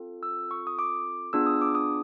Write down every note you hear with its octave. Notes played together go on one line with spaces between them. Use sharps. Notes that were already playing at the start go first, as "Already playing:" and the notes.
Already playing: C4 F4 A4
E6
C#6
D#6
D6
B3 D4 F4 G#4 E6
D#6
D6
D#6